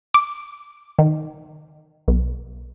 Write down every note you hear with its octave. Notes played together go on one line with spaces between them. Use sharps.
D6
D#3
B1